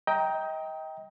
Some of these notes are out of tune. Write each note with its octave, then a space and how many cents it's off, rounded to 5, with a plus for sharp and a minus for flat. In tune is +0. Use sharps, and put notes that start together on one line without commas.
D#5 +30 G5 +0 A#5 +5